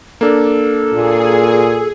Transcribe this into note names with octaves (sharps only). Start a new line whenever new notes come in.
A#3 D4 A4
A#2 G#4